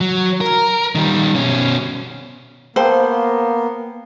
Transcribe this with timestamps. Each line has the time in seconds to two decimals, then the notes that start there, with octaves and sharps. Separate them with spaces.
0.01 F#3
0.41 A#4
0.95 D#3 G3
1.36 B2 C#4
2.76 A#3 B3 C5 F5 G5 A5